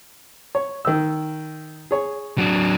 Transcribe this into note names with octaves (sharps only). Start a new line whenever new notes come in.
C#5
D#3 E6
G#4 C#5
F#3 D4